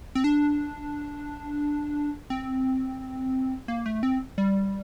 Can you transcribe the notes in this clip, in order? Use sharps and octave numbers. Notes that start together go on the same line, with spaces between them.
C4
D4
C4
A#3
A3
C4
G3